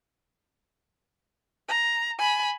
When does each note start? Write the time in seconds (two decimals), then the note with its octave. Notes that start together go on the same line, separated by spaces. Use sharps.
1.69 A#5
2.18 G#5 B5